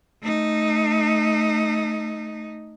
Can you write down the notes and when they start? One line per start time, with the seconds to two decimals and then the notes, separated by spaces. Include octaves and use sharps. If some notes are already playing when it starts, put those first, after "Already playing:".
0.23 A3 D#4